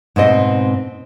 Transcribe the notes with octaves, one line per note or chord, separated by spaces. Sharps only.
G#2 B2 C4 D#5